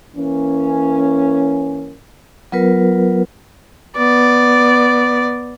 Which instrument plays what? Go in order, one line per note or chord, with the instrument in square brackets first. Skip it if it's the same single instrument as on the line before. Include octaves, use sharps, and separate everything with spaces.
[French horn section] E3 A#3 C#4
[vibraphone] F#3 B3 F4 A#4 B4
[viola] B3 D5